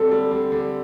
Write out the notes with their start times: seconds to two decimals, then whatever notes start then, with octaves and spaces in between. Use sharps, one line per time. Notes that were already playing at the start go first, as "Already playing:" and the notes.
Already playing: D3 G3 C4 A4
0.11 G3
0.31 D3
0.52 D3